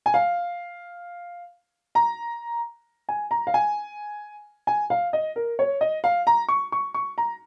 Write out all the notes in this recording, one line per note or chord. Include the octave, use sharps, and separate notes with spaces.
G#5
F5
A#5
G#5
A#5
F5
G#5
G#5
F5
D#5
A#4
C#5
D#5
F5
A#5
C#6
C#6
C#6
A#5